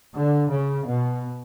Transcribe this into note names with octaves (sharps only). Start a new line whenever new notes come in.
D3
C#3
B2